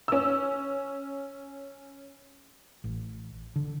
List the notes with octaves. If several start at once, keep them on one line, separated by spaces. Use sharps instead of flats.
C#4 E6
A1
D3